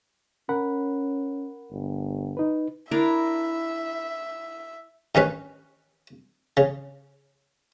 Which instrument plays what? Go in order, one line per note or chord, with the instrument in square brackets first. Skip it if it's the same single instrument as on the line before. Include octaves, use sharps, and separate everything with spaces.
[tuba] C#4 [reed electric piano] A#4 F#5 B5
[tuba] G1
[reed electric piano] D#4 B4
[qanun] D4 E4 A#4 [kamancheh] E5
[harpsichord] G2 D#3 C#4 B4
C#3